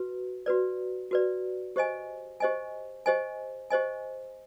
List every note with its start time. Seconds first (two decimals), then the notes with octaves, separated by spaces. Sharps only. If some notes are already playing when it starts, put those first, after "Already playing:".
Already playing: F#4 B4
0.46 F#4 B4 D5
1.11 F#4 B4 D5
1.76 G4 C5 D#5 G#5
2.40 G4 C5 D#5 G#5
3.06 G4 C5 D#5 G#5
3.70 G4 C5 D#5 G#5